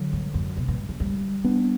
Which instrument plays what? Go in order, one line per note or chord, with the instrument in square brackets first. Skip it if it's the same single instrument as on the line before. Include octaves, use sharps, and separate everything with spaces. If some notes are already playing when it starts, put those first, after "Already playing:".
Already playing: [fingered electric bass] D3 F#3
[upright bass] G2
F#2
B2
G2
C#3
G3
[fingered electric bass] B3 D4